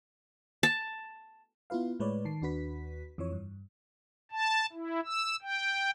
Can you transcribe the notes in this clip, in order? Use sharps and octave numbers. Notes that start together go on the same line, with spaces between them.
A5
B3 E4 F4 B4 F5
A2 G#3 B4 C#5 D5
D#3 A5 C7
D#2 D4 F#4 B4 B6
F2 E3 F3 C#5
G2
A5
E4
E6
G5